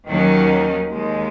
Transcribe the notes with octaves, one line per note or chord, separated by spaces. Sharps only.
D#2 D#3 F#3 C#4
D#2 D#3 G#3